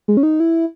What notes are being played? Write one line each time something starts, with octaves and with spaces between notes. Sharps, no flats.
G#3
C#4
D#4
E4